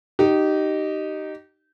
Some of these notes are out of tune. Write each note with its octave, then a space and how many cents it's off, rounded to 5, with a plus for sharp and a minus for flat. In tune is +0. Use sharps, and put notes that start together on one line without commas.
D#4 -10 G4 -25